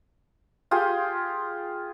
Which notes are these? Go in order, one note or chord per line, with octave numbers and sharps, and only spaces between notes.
F4 G4 G#4 G5